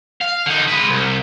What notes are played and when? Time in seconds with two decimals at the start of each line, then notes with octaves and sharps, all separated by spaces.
0.21 F5
0.46 D3 D#4
0.68 G#3 B4
0.89 C2